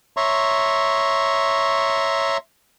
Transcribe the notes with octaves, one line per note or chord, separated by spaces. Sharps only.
C#5 E5 A#5 C6 C#6